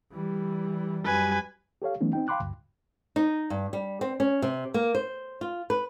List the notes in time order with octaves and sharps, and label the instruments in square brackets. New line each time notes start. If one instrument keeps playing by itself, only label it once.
[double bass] E3 G3
[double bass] F#2 G3 [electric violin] B4 G#5
[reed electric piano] G4 A4 C#5 F5
E3 F#3 A3 B3 C#4 D#4
C4 D#4 G5
F5 G5 B5 C6 D6 F#6
D2 G2
[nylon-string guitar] D#4
G2
G3
C4
C#4
C3
A#3
C5
F4
B4